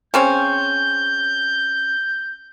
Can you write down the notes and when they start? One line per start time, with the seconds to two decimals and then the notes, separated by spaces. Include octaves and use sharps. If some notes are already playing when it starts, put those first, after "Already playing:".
0.14 C#3 C4 C#4 G6